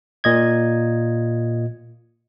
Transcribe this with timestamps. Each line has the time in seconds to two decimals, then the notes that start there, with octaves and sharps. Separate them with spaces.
0.24 A#2 D#5 G#6